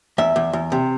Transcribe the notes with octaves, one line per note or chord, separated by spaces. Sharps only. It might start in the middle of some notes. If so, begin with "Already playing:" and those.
E2 E5
E2
E2
C3